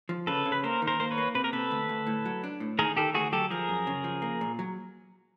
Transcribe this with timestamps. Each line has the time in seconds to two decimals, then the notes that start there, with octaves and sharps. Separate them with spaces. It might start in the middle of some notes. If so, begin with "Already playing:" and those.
0.09 F3
0.27 C#3 A4 B4
0.45 C#3
0.52 B4
0.63 A#3 A#4 C5
0.82 D#3
0.87 A#4 C5
1.00 A#3 C5
1.11 B4 C#5
1.18 A#3
1.35 C3 B4
1.44 A#4
1.53 C3 A4 B4
1.71 D2
1.89 D2
2.07 A2
2.25 F#3
2.44 D4
2.60 A2
2.78 D#3 G#4 A#4
2.97 D#3 G4 A4
3.14 D2 F#4 G#4
3.33 F#3 G4 A4
3.50 F3 G#4 A#4
3.69 F#2
3.87 C#3
4.04 F3
4.22 A#3
4.41 A#2
4.59 F#3